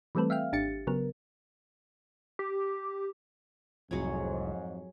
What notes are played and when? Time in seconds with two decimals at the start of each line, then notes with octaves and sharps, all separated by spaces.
0.15 E3 G3 A3 C4 A4 B4
0.30 E5 F5 G5 F6
0.53 G#1 D4 G4 A6 C#7
0.87 C#3 F#3 B3 A#4
2.39 G4
3.91 F1 C2 F2 G#2 F#3 G#4 C#5